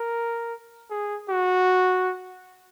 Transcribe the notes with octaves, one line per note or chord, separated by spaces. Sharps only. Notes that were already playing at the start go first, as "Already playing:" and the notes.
Already playing: A#4
G#4
F#4